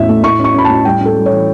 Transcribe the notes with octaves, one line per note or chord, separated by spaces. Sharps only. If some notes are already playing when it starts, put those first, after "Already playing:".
Already playing: E2 A2 C#4 E5
A3
A2 C#6
C#4 C#6
C#4 B5
A2 A5
G3 G5
C#4
A4
G3
E3 C#5